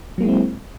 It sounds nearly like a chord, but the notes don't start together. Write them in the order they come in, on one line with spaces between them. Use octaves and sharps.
F#3 A#3 G#3 E4 C4